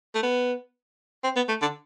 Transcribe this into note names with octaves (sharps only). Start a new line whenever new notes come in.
A3
B3
C4
B3
A3
D3